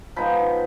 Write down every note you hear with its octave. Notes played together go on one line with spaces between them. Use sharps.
F3 G#3 B3 D#4 B5